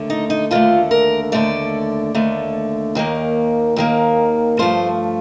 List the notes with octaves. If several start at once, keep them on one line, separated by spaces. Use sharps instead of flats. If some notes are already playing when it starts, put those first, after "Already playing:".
Already playing: D#2 D3 A3
D#4
D#4
D#2 D3 A3 F4
A#4
D#2 D3 A3 D5
D#2 D3 A3
D#2 D#3 A#3
D#2 D#3 A#3
G2 F3 A3 C5